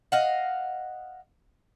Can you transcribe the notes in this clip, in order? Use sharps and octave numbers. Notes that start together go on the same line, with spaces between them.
D#5 F5 F#5